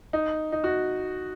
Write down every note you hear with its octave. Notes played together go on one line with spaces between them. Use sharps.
D#4
D#4
F#4